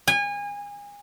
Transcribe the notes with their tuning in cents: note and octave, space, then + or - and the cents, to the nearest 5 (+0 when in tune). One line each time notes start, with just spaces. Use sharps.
G#5 -30